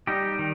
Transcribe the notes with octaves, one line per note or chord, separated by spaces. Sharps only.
G3 D#4 G4
D#3